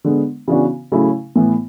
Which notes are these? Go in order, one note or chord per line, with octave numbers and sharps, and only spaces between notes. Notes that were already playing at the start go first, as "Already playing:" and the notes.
D3 G#3 B3
C#3 E3 B3 D4 F#4
C#3 F#3 A3 E4
A2 E3 B3